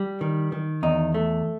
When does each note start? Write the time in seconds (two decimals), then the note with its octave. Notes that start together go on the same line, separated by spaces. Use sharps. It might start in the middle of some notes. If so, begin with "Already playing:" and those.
Already playing: G3
0.21 D#3
0.52 D#3
0.83 E2 D#4
1.14 A3